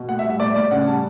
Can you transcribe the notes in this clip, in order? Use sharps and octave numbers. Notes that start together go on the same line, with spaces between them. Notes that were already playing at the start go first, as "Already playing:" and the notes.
Already playing: B2
A2 F#5
E5
G3
E5
A2 D5
A2 D5
C#3 F#5
G3 A5